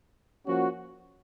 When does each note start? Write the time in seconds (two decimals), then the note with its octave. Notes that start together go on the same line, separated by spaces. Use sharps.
0.47 F3 A#3 C#4 F#4